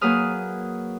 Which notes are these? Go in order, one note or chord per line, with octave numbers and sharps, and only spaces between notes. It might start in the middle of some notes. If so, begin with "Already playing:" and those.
F#3 A#3 G#4 B4 D#6 F6